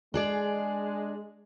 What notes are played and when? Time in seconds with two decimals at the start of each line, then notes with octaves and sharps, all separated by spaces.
0.14 G#3 D4 G#4 D5